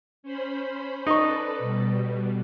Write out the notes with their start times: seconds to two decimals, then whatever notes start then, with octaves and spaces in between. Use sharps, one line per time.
0.23 C#4 C5 B5
1.07 D#4 A4 B4 D5 C#6
1.58 B2 G3